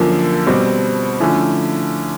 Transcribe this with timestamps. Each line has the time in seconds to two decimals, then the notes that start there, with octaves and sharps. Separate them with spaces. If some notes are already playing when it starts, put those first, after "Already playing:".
Already playing: F#2 D3 F3 A#3
0.47 B2 G3 C4
1.20 D3 F3 A3 C#4 E4